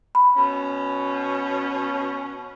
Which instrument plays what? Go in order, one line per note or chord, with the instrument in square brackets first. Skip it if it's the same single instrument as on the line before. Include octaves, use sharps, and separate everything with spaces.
[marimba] B5
[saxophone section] B2 C#4